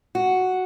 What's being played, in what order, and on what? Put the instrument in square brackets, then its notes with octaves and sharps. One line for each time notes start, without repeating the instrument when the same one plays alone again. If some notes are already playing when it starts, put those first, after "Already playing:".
[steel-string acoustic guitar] F#4